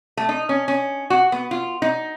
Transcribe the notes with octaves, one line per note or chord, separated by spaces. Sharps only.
A3
D#4
C#4
C#4
F#4
B3
F4
D#4